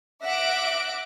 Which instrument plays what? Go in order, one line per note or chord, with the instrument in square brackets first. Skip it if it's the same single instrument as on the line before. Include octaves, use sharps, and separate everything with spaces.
[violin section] E5 F#5 D6 F#6 A#6 D7